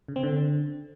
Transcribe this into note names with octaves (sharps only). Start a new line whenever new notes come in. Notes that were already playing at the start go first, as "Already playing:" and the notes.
C#3
C4
D3